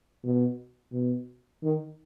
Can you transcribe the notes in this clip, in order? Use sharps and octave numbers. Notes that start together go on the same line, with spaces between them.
B2
B2
D#3